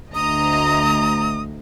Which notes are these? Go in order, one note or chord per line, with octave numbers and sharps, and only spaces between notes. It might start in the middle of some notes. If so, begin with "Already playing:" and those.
D2 D#5 A#5 D#6